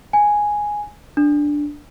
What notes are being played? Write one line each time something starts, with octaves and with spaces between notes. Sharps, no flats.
G#5
D4